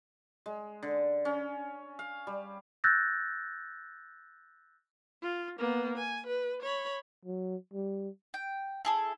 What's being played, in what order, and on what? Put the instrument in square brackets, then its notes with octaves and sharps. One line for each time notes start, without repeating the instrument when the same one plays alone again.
[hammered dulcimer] G#3
D3
C#4
F5
G3
[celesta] E6 F#6 G6 A6 A#6
[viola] F4
A#3 B3
G#5
B4
C#5 B5
[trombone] F#3
G3
[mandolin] G5
E4 G#4 A4